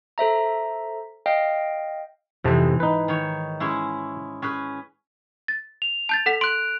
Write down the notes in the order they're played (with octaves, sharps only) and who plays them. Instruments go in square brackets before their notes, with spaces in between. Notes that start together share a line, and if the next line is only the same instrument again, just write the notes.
[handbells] A4 C5 E5 A#5
D#5 F5 G5
[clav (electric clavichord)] F2 C3 A5 [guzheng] G#2 E3
[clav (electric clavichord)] D#4 B4
[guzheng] D#3 C#5
G#3 C#4 E4
C#4 G#4 B4
[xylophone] A6
[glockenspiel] F7
[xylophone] A5 G6 A6
A4 F#5 B6
[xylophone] C6 [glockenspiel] F#6 D7